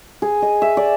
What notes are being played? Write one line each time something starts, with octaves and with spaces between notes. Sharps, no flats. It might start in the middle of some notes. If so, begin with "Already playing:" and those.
G#4
D#5
E5
D5